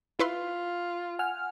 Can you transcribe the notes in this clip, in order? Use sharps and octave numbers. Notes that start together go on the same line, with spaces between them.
E4 F4 B4 C6
F#5 G#5 F6